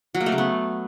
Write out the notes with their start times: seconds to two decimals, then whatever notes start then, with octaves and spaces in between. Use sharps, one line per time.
0.15 F#3
0.20 A#3
0.26 A3
0.32 C#3
0.38 B3